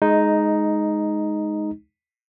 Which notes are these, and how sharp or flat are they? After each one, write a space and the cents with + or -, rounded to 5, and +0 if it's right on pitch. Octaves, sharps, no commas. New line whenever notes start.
G#3 +15 D#4 +0